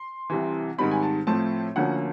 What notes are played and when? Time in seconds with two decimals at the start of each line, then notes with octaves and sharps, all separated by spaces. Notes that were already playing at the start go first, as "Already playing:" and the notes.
Already playing: C6
0.30 C2 C3 E3
0.78 G#2 D#3 G3 C4 B5
0.91 G#5
1.03 A5
1.27 A2 F3 A3 C4 A5
1.76 D2 D3 F3 A#3 C#4 F#5